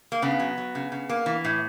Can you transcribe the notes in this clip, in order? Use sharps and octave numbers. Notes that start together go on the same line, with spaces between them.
A#3
C#3 B3
F#3
F#3
C#3
C#3
A#3
E3
A2